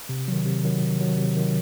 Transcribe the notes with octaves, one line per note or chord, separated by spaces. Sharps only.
C3
D#3 F#3
C3
D#3 F#3
C3
D#3 F#3
C3
D#3 F#3